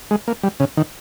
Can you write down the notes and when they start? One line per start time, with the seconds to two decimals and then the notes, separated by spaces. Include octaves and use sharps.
0.11 G#3
0.28 A#3
0.43 G3
0.60 C#3
0.77 D#3